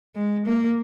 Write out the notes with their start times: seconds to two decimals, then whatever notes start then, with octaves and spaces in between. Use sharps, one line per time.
0.16 G#3
0.46 A#3